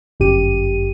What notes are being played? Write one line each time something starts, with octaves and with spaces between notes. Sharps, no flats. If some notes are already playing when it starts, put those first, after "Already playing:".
G1 F#2 G4 D#7